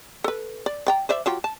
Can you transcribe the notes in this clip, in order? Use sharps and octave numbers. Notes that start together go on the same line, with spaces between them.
A4 B4
D5
D5 G5 A#5
C5 D5 E5
F#3 F4 G4
A5